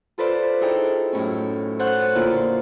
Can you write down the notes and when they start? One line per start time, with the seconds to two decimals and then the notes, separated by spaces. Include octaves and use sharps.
0.18 F4 A4 B4 C5 D5
0.61 D#4 E4 G#4 A4 G5
1.13 F#2 A2 C#4
1.79 A4 C5 C#5 F#5 F#6 G6
2.15 A#2 D3 A#3 E4 F4